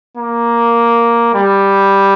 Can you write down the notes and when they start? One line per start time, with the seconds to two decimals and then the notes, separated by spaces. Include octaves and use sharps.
0.17 A#3
1.34 G3